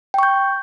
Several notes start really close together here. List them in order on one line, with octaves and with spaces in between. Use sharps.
G5 C#6 G6